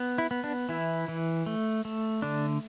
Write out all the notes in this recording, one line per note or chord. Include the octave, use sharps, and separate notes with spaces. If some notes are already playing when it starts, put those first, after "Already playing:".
Already playing: B3
E4
B3
D4
E3 E4
E3
A3
A3
D3 D4